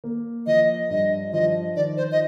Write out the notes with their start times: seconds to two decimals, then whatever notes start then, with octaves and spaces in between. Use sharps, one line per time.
0.04 A#3
0.47 F3 D#5
0.90 G2 D#5
1.33 F3 D#5
1.76 D#3 D5
1.97 C5
2.12 D#5